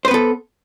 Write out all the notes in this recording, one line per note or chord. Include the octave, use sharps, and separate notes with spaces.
B3 A4 B4 C5